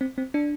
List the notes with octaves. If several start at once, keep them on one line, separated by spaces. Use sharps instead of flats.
C4
C4
D4